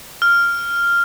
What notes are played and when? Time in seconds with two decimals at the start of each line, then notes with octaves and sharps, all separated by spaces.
0.22 F6